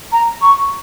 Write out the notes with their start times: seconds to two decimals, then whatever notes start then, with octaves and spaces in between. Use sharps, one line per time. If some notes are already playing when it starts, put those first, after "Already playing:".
0.12 A#5
0.42 C#6